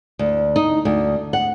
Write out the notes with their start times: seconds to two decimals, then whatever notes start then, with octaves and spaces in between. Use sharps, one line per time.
0.19 D2
0.56 D#4
0.85 D2
1.33 F#5